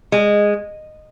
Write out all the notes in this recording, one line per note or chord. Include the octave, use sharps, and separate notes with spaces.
G#3